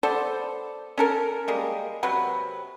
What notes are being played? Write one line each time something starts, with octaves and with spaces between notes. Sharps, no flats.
B3 A4 C5 D5
C#4 A4 A#4
G3 G#3 A#3
C3 F#3 B4